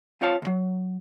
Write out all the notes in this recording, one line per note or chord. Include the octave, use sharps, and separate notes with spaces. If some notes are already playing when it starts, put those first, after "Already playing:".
C4 F4 C5 C#5 F5 A5
D2 F#3